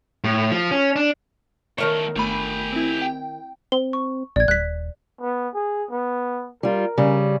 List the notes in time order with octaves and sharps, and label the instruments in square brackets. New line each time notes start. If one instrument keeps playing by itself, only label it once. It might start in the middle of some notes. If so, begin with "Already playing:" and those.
[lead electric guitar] A2
F3
C#4
D4
[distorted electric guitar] E2 A3 [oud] D#3 A#4 C#5
[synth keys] G1 A3 B5 [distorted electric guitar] G4 G#5
[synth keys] C4 E4
G5
[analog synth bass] C4 [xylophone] G7
[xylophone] C#6
[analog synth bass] A#1 [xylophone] D5 G#6
[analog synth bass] D#1 [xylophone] F#6 B6
[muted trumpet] B3
G#4
B3
[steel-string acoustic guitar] G3 F4 [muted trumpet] A#4
[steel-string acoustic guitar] C#3 G3